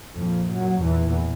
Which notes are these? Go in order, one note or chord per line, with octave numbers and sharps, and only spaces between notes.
F2 A#2 F3
F#2 F#3
E2 A#2 E3